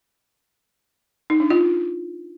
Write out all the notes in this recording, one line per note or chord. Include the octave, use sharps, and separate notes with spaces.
D#4
D4
F4